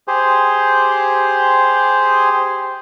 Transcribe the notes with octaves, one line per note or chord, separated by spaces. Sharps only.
G4 G#4 C5